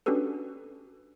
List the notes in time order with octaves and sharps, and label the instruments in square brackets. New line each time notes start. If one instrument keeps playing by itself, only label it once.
[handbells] C#4 D4 F#4 G4 A4 B4